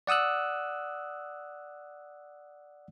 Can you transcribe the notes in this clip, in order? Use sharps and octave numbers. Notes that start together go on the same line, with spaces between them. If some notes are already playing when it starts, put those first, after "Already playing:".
D5 F#5 D#6 E6 F#6